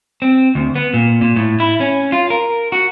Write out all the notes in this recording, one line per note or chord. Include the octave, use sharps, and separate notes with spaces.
C4
D2
B3
A#2
A#2
A2
E4
C#4
F4
A#4
F#4